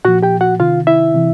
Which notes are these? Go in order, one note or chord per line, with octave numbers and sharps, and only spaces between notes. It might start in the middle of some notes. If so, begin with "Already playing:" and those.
A#2 F3 F#4 F#5
G4 G5
F#4 F#5
C3 D#3 F4 F5
E4 E5
C3 E3